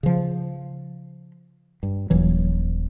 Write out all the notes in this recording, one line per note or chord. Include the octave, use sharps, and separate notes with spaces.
C#3 F3
G2
D#1 E3 F#3